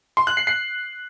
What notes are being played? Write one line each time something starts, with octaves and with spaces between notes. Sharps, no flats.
C6
F#6
C7
C7